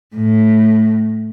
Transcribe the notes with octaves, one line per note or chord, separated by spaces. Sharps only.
A2